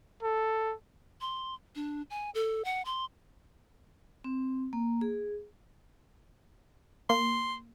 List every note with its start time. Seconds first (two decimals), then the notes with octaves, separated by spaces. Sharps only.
0.23 A4
1.21 C6
1.75 D4
2.10 G#5
2.35 A4
2.65 F#5
2.85 C6
4.24 C4
4.73 A#3
5.01 G#4
7.10 A#3 C6